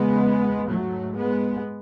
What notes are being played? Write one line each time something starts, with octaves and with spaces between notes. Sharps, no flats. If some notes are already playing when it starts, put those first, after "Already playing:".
Already playing: E2 C#3 G#3 B3
G#2 F#3 A3
G#3 B3